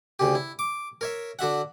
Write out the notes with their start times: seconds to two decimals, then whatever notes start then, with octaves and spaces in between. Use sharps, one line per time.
0.19 D2 C#3 G4
0.35 E4
0.59 D6
1.01 A#4 C#5 E5
1.39 D3 F#4 E5 F#5